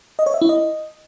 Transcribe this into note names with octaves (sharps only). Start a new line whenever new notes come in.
D#5
C#5
E5
E4
D#5